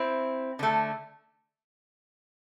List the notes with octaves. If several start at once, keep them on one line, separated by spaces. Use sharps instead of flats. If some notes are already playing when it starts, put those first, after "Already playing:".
Already playing: C4 E4
D3 A3